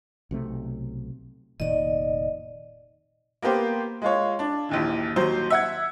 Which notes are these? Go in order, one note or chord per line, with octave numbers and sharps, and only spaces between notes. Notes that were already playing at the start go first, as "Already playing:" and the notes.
B1 C3 A3
F1 A#2 D#3 D5 D#5
A#3 B3 G4 C5
G#3 F4 C#5
D4
A#1 D#2 E3
D#2 F#3 C5
E5 F#5 G#6